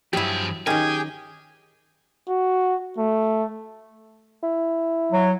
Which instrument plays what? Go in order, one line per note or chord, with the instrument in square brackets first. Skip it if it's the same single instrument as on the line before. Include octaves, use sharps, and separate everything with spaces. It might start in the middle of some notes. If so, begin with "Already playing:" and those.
[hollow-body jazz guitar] G2 G4 [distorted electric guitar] F3 G#4 [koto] F#3 E4
[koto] D#3 C#4 [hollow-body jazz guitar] D#4 A#4 [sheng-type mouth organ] G4 G#4 G5 [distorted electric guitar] G#5
[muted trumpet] F#4
A3
[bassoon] E4
[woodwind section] F#3